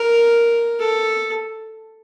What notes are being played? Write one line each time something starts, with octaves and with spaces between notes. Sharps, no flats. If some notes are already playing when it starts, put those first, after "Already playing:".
Already playing: A#4
A4